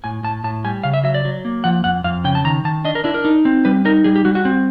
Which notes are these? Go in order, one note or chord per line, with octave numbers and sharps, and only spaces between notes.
A2 G#5
A2 A5
A2 A5
G3 G#5
C#3 F5
E5
F#3 E5
D5
F#3
A#3
F3 F#5
F2 F#5
F2 F5
C#3 G5
A5
D#3 A#5
D#3 A5
D4 D#5
A#4
D4 E4
A#4
D#4
C4
G3 B4
D#4 A#4
G3 G#4
G4
G3 F#4
F#4
C4